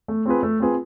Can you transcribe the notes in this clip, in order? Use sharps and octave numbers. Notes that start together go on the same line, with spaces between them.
A3
C4 F4 G#4 B4
A3
C4 F4 G#4 B4